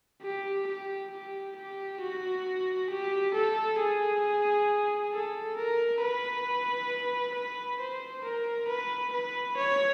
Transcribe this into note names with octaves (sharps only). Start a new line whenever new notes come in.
G4
G4
G4
G4
F#4
G4
A4
G#4
A4
A#4
B4
B4
C5
A#4
B4
B4
C#5